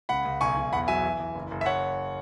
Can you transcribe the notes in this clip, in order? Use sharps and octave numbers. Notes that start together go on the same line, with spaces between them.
C#2 F#5 B5
C#2
B1 G#5 C#6
B1
E2 F#5 B5
F#3 E5 G#5
E3
E3
F#1
F#1
E5
C#5 F#5